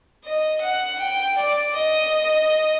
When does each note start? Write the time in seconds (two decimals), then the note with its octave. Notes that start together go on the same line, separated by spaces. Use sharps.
0.25 D#5
0.61 F#5
1.00 G5
1.37 D5
1.76 D#5